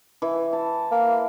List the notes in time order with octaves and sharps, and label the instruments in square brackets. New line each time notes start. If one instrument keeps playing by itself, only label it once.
[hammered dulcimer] E3
A5
[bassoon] A#3